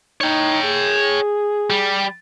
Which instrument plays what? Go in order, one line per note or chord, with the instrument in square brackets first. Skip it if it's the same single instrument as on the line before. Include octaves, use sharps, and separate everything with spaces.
[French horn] D#4 [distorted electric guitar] C#5 G5
[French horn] G#4
[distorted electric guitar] G3